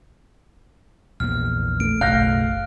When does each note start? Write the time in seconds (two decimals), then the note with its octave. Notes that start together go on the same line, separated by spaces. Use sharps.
1.20 A#1 E2 A#3 F6
1.80 A3 D7
2.01 F#1 B1 A3 F5 F#6 G6 A#6